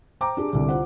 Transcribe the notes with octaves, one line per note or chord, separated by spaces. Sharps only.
C5 G5 A#5 D6
D4 G4 G#4
C2 D3
F4 C5 F#5